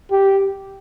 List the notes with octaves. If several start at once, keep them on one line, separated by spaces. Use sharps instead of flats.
G4